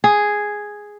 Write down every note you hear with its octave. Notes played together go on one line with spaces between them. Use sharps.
G#4